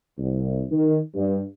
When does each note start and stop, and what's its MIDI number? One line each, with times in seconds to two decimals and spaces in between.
0.18 0.63 36
0.71 0.98 51
1.15 1.41 43